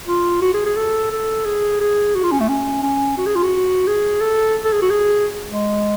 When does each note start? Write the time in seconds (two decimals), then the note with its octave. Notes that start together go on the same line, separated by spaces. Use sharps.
0.07 F4
0.42 F#4
0.54 G#4
0.66 G#4
0.76 A4
1.11 A4
1.45 G#4
1.81 G#4
2.15 F#4
2.23 F4
2.32 C#4
2.40 A3
2.48 C#4
2.83 C#4
3.18 F#4
3.26 G#4
3.36 F4
3.43 F#4
3.87 G#4
4.21 A4
4.64 A4
4.73 G#4
4.82 F#4
4.90 G#4
5.50 G#3